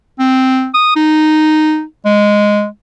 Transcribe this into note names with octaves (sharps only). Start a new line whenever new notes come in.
C4
D#6
D#4
G#3